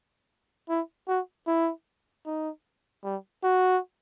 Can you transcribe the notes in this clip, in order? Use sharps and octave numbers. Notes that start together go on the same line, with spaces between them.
E4
F#4
E4
D#4
G3
F#4